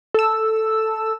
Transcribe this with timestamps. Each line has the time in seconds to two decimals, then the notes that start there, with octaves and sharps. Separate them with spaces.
0.14 A4 E6